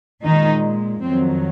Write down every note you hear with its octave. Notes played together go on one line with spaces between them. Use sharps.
A#2 D#3 G#3 D#4
F2 D#3 F#3 C4